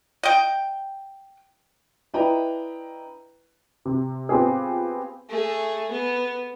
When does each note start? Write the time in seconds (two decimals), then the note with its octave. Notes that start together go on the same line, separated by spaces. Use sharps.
0.23 D#5 G5
2.14 D4 E4 B4 D#5 G5 A#5
3.85 C3
4.29 B3 C4 F4 G4 G#4
5.29 A3 G#4
5.91 B3